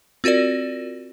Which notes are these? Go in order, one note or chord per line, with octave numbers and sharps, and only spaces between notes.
C4 F4 F#4 A#4 D5